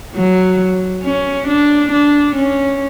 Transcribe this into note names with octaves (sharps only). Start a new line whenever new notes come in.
F#3
C#4
D4
D4
C#4